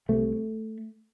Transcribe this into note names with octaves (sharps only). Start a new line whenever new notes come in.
C2 C3 A3